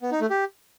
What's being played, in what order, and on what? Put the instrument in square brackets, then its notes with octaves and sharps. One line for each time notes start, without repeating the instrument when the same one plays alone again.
[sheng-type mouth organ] B3
D#4
A3
G4